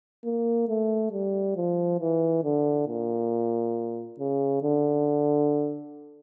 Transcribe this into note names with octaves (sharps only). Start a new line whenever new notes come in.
A#3
A3
G3
F3
E3
D3
A#2
C#3
D3